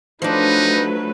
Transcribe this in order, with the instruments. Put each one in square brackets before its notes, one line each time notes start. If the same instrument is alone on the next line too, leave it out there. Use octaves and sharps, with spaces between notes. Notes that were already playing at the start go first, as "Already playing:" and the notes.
[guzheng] F3 D4 [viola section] F#3 A3 B4 [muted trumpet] D#4